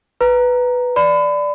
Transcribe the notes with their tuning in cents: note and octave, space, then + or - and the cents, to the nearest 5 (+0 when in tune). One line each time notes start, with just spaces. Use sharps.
B4 +0 A#5 +0
D5 +0 B5 +30